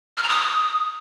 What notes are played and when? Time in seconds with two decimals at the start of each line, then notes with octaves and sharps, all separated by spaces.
0.17 F6
0.23 A#5
0.29 D#6